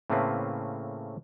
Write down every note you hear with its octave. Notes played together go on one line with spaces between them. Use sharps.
A2 C#3 A3 A#3 C4 B4